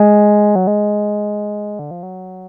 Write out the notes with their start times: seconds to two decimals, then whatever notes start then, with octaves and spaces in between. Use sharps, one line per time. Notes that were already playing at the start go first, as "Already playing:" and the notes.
Already playing: G#3
0.55 F#3
0.67 G#3
1.79 D3
1.91 F3
2.03 F#3